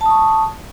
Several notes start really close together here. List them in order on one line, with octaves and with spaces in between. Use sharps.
A5 D#6 C#6